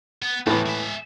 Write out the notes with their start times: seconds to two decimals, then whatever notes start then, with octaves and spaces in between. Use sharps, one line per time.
0.22 B3
0.47 A2 E3 F3 B3
0.66 G#3 E5